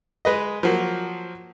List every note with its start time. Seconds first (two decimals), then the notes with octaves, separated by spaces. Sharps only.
0.25 G#3 B4 D#5
0.63 F3 F#3 A#3